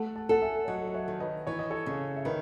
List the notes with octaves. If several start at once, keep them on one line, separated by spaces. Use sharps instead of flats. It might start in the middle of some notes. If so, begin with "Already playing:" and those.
Already playing: A3 F#5 A5
A5
A4 F#5 A5
E5 G#5
F#3 D#5 F#5
D#5
C#5 E5
D#3
B4 D#5
E3 C#5
D#5
A4 C#5
C#3
E5
D#3 B4 D#5